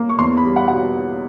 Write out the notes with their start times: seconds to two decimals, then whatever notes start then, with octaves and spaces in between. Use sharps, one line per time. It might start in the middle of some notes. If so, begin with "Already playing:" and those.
Already playing: A#3
0.09 C#6
0.19 E2 C6
0.37 B5
0.44 G3
0.56 F#5
0.68 B2 F#5